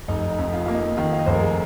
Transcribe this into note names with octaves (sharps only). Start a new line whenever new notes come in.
F1 D#4
D#4
F2
F4
A#3 F4
D#4
D#3 F4
F5
D#5
F1 C5
A#4
G#4